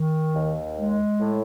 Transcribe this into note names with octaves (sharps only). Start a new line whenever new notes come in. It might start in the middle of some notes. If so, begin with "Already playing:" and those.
Already playing: D#3
D#2
G#3
A2